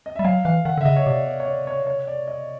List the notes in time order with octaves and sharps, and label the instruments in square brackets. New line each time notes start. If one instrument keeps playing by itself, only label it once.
[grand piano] D#5
[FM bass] G3 [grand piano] E5
[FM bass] F#3 [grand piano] F5
[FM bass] E3 [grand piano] F5
[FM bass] D#3 [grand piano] F#5
[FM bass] D3
[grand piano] E5
[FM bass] C#3 [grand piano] D#5
[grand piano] C#5
[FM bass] C3 [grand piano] D5
[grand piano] D5
C#5
D5
C#5
C#5
D5
D#5